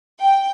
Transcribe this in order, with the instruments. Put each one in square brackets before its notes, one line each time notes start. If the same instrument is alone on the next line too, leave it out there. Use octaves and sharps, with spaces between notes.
[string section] G5